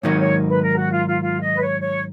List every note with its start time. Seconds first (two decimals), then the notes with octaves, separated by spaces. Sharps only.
0.03 G#2 D#3 F#3 A#3 D#4 C#5
0.19 C#5
0.48 B4
0.62 A#4
0.77 F#4
0.91 F4
1.07 F4
1.21 F4
1.40 D#5
1.54 B4
1.60 C#5
1.79 C#5